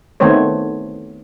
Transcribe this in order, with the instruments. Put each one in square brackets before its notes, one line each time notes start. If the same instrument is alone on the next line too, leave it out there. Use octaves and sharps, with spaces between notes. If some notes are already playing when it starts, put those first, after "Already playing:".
[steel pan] D#3 A3 B3 C4 C5 C#5